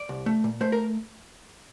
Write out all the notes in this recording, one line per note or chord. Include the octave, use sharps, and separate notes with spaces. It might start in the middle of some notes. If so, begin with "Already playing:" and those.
Already playing: D5
C2
A3
A#2
A3 C5
A#4